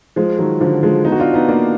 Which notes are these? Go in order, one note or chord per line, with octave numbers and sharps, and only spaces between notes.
F3 G#3
D#3 F#3
D3 F3
F3 G#3
B3 D#4
F#4
D4 F4
B3 D#4
A#3 D4